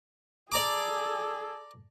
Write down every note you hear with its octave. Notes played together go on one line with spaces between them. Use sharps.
G#4 A4 D5 A#5 D6